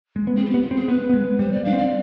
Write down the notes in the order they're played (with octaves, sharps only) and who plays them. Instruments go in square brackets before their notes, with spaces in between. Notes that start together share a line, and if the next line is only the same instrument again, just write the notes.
[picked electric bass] G#3
B3
[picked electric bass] C4 [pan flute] G#4
[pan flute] F4
[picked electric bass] B3 [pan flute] G4
[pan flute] F4
[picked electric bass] C4
[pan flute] G#4
[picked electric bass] B3 [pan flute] B4
[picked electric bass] B3
G#3
[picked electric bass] G3 [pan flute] C5
[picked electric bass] G3 [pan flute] D5
[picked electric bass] D4 [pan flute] F5
[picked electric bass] C4
[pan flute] D5